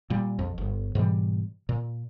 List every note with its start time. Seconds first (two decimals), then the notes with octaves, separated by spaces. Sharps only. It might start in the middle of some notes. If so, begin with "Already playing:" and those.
0.10 A#2 G3
0.39 A#1 F2
0.58 G1
0.95 G#2 B2 E3 G3
1.69 A#2